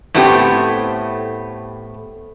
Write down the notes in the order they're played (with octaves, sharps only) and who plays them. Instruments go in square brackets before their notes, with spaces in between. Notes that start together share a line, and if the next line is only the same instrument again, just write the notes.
[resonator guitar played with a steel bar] A2 A3 B3 C4 D#4 G4